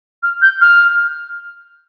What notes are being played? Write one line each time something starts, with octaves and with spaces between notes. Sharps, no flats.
F6
G6
F6